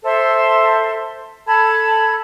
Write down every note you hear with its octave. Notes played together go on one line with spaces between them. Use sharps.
A4 C5 E5 C6
A4 A5 B5 G#6